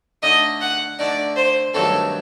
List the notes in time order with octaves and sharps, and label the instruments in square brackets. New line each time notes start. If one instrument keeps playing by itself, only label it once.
[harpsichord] D3 A3 D#4 [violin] D#5
[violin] F#5
[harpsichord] D3 A3 D#4 [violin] D5
[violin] C5
[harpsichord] G2 D#3 F#3 A3 C4 [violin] A4